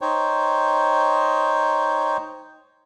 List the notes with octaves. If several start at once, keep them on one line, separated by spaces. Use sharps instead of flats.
D#4 C5 C#5 G5